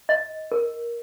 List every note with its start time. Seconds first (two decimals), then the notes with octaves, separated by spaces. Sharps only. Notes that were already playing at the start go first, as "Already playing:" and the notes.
0.09 D#5
0.52 A#4